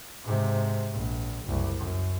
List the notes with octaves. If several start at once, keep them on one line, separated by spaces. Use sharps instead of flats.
G#2 C3
A#1
F#1 C2
F#2